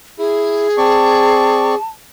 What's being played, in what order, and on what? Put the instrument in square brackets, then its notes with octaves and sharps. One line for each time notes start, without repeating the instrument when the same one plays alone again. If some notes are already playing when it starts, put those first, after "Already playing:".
[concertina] E4 [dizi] G#4
[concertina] C4 D5 C#6 [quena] A5